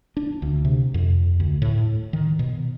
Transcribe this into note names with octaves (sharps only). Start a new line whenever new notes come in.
D4
D2
C3
F2
D2
A2
D#3
B2